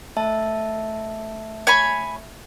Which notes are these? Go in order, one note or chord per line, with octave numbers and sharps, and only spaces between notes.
A3 E5 A5
C#5 G#5 B5